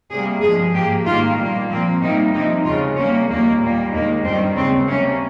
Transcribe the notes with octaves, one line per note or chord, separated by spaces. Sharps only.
C3 G3 A#3 G#4
G2 F3 G#3 G#4
G#2 F3 A#3 G4
G#2 D#3 G3 A#3 F4
A#2 G3 A#3
A#2 F3 A#3 C4
C3 G3 A#3 D#4
C3 F3 A#3 D#4
D#2 C#3 G#3 F4
C3 G3 A#3 C#4
D#2 D#3 G3 A#3
A#2 G3 A#3
D#2 D#3 G#3 A#3
G2 D#3 G3 C4
D#2 C#3 G#3 C4
C3 G3 A#3 C#4